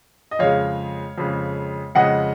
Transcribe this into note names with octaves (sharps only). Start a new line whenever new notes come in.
D#5
F2 C#3 G#3 C#5 F5
F2 C#3 G#3
F2 C#3 G#3 D#5 F#5